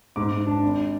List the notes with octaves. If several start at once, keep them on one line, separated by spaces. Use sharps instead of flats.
G#2 D6
G#2
D4
G#1